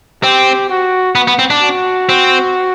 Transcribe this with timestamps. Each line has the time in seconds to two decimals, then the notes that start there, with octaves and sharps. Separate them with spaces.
0.23 C4 G4
0.69 F#4
1.15 B3
1.27 B3
1.39 C4
1.50 D4
1.62 F#4
2.09 C4